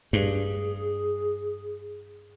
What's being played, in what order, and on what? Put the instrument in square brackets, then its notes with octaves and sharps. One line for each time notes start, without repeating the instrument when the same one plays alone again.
[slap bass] G2 [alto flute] G#4